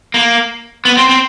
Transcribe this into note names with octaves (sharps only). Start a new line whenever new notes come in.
A#3
B3
C4
C4